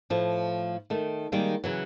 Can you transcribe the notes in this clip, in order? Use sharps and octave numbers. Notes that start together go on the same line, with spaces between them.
A2 F3 A3
D#3 A3
D#3 G3 G#3 A#3 D#4
C#3 E3 F#3